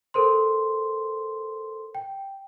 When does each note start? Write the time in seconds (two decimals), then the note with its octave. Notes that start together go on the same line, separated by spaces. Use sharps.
0.14 A4 A#4 C5 C6
1.95 G5